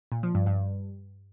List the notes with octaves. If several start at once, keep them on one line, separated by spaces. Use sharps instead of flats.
A#2
F3
G2
G2